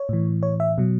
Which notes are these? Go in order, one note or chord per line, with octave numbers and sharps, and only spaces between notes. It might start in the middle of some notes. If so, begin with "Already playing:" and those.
Already playing: C#5
A2 E3
C#5
E5
B2 F#3